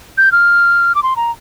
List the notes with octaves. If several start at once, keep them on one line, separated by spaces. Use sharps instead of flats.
G6
F6
D6
C6
A#5